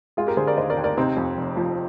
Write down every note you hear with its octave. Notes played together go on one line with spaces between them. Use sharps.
G#3 F4 G#4
G4 A#4
D3 G#4 C5
A#4 D5
D#2 C5 D#5
A#4 D5
D#2
A#4 D5
C3 C4 D#4
F2
F1
F3